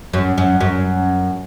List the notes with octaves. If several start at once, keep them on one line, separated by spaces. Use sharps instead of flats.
F#2
F#2
F#2